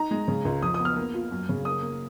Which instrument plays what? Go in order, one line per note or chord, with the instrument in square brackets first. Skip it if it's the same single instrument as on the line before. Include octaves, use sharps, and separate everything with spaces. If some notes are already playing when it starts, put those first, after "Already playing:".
Already playing: [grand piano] D#4 A#5
G#3
C#3
C#2
F2 D#6
D#6
B3
F6
A#3
F4
F#2
C#3
A#3 D#6
A#3